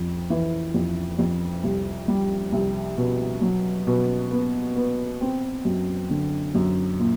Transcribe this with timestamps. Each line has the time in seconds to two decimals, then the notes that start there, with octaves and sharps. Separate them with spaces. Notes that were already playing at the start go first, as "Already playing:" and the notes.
Already playing: F2
0.30 E3
0.74 F2
1.19 F2
1.64 C2
2.08 G3
2.52 C2
2.97 B2
3.42 F#3
3.87 B2
4.31 B3
4.75 B3
5.21 C4
5.65 F#2
6.10 D3
6.55 F#2
6.99 A#2